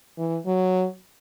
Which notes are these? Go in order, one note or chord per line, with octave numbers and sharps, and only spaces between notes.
E3
F#3